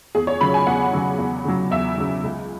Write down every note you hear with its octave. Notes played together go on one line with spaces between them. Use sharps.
E2 G#4
C#5
C#3 F#3 B5
G#5
E2 F#5
C#3 F#3
E2
C#3 F#3
E2 E5
C#3 F#3
C#2